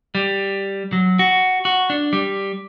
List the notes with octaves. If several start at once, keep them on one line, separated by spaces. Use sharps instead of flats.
G3
F#3
F#4
F#4
D4
G3